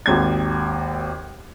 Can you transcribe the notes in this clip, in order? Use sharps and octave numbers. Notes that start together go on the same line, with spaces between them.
G#1 D#2 G#6